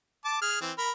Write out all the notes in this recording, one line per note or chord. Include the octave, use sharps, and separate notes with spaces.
A5 D6
G#4 F6
E3 C4
A#4 B5